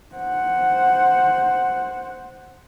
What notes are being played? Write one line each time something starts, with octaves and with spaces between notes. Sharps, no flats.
C5 F#5